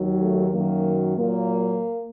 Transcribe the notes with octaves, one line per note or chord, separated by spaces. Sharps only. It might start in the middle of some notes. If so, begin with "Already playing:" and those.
Already playing: D#2 D#3 F#3
A3
F#2 D#3 F#3 A#3
A#2 F#3 A#3